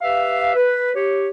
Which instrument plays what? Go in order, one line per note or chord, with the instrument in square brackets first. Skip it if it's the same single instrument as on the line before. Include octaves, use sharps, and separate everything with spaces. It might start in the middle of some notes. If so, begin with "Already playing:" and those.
[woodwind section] G4 B4 E5 F5
B4
G4 C#5